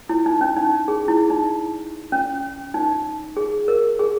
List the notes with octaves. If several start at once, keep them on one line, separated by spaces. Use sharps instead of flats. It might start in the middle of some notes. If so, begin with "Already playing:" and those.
E4
D#4
C#4
D#4
G#4
E4
D#4
C#4
D#4
G#4
A#4
G#4